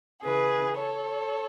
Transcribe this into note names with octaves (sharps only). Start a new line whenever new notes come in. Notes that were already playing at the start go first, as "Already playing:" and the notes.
C#3 E3 G#4 B4
A4 C#5